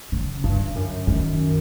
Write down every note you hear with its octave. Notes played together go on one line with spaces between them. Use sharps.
C#3
G2 D3
F#2
D#3